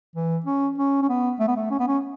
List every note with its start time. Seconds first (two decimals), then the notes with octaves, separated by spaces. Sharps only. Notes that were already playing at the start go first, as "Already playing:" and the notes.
0.16 E3
0.46 C#4
0.78 C#4
1.02 C#4
1.09 B3
1.40 A3
1.48 B3
1.56 A3
1.71 C#4
1.80 B3
1.88 C#4